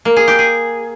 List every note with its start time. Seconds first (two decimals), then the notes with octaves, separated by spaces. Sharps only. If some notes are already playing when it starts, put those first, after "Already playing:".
0.05 A#3
0.16 G#4
0.28 G4
0.39 G#4